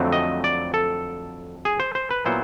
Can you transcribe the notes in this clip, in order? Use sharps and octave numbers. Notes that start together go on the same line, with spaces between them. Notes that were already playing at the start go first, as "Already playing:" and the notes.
Already playing: F2 D3 F#3 A3 C4
D#5
D5
A4
G#4
C5
C5
B4
A#2 F#3 B3 E4 C5